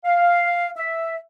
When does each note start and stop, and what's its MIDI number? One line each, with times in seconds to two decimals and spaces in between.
0.05 0.70 77
0.77 1.16 76